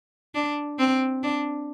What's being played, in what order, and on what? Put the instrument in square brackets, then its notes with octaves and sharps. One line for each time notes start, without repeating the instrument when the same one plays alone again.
[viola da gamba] D4
C4
D4